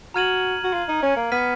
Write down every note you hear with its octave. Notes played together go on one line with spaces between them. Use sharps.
F#4 A#5 F6 G#6 D#7 F#7
F#4
F4
D#4
C#4
A#3
B3 F6 B6 D#7